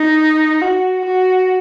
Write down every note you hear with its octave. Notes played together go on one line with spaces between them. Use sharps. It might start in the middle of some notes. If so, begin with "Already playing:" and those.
Already playing: D#4
F#4
F#4